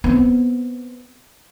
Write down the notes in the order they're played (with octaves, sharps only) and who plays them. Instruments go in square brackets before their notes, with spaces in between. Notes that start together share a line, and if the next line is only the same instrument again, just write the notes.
[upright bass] B3 C4